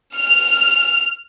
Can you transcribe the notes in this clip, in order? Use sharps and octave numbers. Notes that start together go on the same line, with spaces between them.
F6